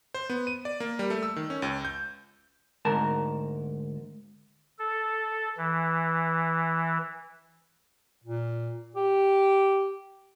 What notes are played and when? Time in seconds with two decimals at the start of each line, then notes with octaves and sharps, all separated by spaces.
0.14 C5
0.29 B3
0.47 D#7
0.65 D5
0.80 A#3
0.99 G3
1.10 A3
1.23 E6
1.36 D#3
1.50 C#4
1.62 C#2
1.85 G6
2.85 D2 G#2 A#4 A5
4.79 A4
5.57 E3
8.24 A#2
8.96 G4